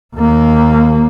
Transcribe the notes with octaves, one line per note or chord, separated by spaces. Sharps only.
D#2 A#3